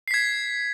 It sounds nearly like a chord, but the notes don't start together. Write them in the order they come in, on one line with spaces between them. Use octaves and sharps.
C7 B6 G#6